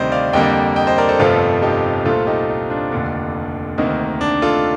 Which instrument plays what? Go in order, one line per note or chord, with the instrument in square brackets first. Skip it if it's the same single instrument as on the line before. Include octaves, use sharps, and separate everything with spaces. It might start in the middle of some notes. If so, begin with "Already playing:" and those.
Already playing: [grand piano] D2 C3 D#3 G3 C4 C5 D5 D#5
D5 F5
F2 D3 G3 A#3 D#5 G5
D#5 G5
C5 D#5
A#4 D5
A4 C5
G1 F2 C3 F3 A3 F4 A4
D#4 G4
C2 A#2 A3 C4 F4 A4
D#4 G4
D#4
D4 F4
F1 D#2 D3
D2 C3 D#3 A#3 D#4
D4
F4 A4